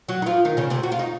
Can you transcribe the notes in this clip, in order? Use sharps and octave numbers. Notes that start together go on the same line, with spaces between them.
F#3 F#4
D#4
F3 F4
D#3 D#4
C#3 C#4
C3 C4
F#4
F4
D#4